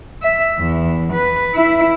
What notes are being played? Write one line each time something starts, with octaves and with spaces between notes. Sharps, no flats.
E5
E2
B4
E4 E5